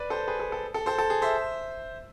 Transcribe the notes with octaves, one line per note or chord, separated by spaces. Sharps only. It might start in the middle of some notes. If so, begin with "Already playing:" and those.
Already playing: B4 D5
A4 C5
G#4 B4
A4
A4
A4
A4 C5
A4
G#4
C5 E5